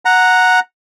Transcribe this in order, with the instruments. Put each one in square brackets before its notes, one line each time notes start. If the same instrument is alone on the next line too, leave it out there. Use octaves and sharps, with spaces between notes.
[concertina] F#5 A#5